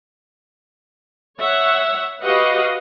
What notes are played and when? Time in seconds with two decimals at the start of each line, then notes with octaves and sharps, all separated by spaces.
1.38 C#5 E5 F#5
2.22 F#4 G4 B4 D#5 F5 F#5